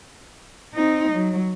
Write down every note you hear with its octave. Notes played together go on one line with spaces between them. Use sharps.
C4 D#4
F#3